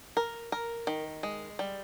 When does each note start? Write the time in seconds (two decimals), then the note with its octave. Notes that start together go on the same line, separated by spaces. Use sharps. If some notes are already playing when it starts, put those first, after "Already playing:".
0.17 A#4
0.52 A#4
0.87 D#3
1.23 G#3
1.59 G3